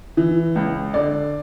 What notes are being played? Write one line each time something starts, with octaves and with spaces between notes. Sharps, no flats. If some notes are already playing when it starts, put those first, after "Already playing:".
E3
C#2
D3 D5